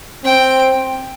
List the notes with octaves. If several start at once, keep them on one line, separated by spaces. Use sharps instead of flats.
C4 G5